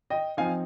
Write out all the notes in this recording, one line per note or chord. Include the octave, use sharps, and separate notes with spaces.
D#5 G5
F3 C4 D#4 F5 G#5